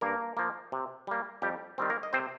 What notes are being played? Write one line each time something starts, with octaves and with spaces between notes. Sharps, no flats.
G2 A#3 A#4
F3 A#3
C3
G3 A#3
F2 G3 G4
D#3 G3 C4
A#3 A#4
D#5
C3 C4 C5